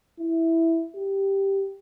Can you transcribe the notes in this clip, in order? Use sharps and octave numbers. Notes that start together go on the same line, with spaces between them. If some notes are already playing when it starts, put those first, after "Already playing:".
E4
G4